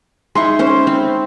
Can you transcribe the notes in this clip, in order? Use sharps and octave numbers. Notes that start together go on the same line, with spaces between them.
G#3 D#4 E4 C6 C#6
C#4 C5
C4